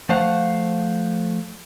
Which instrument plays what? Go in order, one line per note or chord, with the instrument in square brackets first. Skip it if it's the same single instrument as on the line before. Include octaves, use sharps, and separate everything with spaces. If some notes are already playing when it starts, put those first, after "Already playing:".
[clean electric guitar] F3 A3 C5 F5 F#5